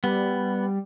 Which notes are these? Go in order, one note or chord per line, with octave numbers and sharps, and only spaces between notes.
G3 B3